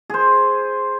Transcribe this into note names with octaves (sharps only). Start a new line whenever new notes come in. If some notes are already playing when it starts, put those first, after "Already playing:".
G#4 C5